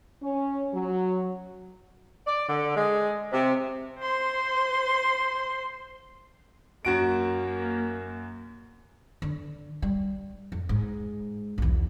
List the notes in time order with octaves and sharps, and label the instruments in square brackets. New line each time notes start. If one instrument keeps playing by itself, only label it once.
[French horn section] C#4
F#3
[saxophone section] D5
D3
G#3
C3
[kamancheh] C5 C6
[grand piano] F#2 F#4 D7 [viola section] A#3
[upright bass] D3
G3
F2
G#2
B1 E2